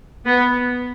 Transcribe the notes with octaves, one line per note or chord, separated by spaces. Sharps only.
B3